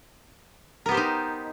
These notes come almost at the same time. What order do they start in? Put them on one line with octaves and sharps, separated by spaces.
A#4 B3 G4 C5 D#4